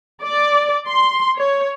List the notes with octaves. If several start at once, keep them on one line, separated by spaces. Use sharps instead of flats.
D5
C6
C#5